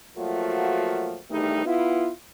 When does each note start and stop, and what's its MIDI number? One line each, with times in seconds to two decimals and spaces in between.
0.18 1.19 53
0.18 1.19 54
0.18 1.19 57
0.18 1.19 58
0.18 1.19 65
0.18 1.19 66
1.31 1.64 40
1.31 1.64 43
1.31 1.64 51
1.31 1.64 55
1.31 1.64 57
1.31 1.64 63
1.66 2.10 59
1.66 2.10 64
1.66 2.10 65